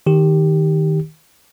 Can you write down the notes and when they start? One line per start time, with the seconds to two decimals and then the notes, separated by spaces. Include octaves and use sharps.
0.07 D#3 G4